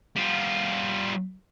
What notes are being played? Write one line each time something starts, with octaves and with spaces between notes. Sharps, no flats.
G3 F4